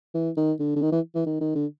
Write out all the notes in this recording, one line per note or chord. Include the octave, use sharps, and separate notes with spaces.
E3
D#3
D3
D3
D#3
E3
E3
D#3
D#3
D3